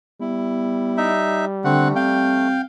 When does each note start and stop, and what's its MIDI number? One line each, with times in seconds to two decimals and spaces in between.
0.21 2.62 55
0.21 1.13 59
0.21 1.12 64
0.97 1.45 63
0.97 1.45 76
1.64 1.95 50
1.64 2.48 57
1.64 1.88 60
1.64 1.88 78
1.96 2.61 60
1.96 2.62 77
1.96 2.62 79